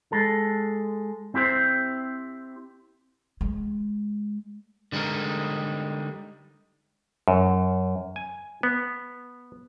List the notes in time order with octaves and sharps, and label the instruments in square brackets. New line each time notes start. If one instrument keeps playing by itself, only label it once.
[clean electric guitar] G#3 A4
C4 E4 G4 C5
[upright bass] G#3
[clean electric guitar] D3 G3 G#3 D#4 A#4
[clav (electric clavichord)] F#2
G#5
B3